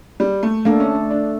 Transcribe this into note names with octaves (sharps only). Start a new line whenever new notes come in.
G3
A3
A3 A#3 D4 A4
C#4
D4